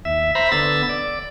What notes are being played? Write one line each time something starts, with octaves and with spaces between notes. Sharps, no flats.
D#2 E5
C5 E5 A#5 B5
D3 B3 E6 A6
D5